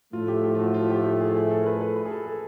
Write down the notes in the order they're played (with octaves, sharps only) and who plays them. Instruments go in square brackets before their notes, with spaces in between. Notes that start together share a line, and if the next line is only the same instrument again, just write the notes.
[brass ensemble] A2 F3 A3 [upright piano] F4
[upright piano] G4
G4
F4
F#4
F4
G4
G4
G#4
G#4
A4
A#4
B4
B4
B4
G#4
A4
A4